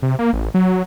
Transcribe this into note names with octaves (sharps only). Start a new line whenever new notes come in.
C3
A#3
A1
F#3